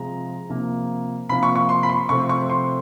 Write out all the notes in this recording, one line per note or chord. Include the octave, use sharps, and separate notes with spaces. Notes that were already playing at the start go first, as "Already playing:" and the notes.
Already playing: C3 F3 G#3 A#5
C3 F3 A#3
C3 F3 A#3 B5
C#6
C#6
C6
B5
C6
C3 F3 A3 C4 C#6
C#6
C6